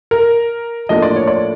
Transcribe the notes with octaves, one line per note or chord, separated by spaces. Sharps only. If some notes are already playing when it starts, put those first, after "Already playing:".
A#4
A2 F3 A#3 D4 D#5
D5
C#5
D5